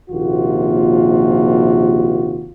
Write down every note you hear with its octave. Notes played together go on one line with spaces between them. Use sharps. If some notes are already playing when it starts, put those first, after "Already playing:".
A#1 D#2 C3 F4 F#4